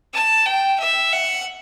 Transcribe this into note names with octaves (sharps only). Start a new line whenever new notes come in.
A5
G5
E5
F#5